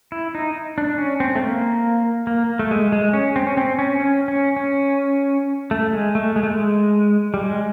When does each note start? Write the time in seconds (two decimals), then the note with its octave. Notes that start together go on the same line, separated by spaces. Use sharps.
0.12 E4
0.35 D#4
0.78 D4
0.98 C#4
1.20 C4
1.35 A3
1.42 A#3
2.27 A#3
2.59 A3
2.71 G#3
2.92 G#3
3.13 C#4
3.36 C4
3.47 C#4
3.57 C4
3.79 C#4
4.00 C#4
4.28 C#4
4.56 C#4
5.71 A3
5.93 G#3
6.15 A3
6.36 G#3
6.43 A3
6.51 G#3
7.34 G3
7.44 G#3